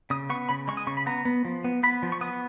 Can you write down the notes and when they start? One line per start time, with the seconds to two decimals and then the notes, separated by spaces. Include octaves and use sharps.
0.10 C#3 D#6
0.30 B3 C#6
0.49 C#3 B5
0.68 G#3 C#6
0.77 D#6
0.87 C#3 C#6
0.97 B5
1.06 B3 A#5
1.25 B3
1.45 F3
1.64 B3
1.83 B3 B5
2.03 F3
2.12 C#6
2.21 B3 D#6